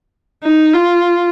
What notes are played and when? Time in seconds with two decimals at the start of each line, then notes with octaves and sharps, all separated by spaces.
0.43 D#4
0.74 F4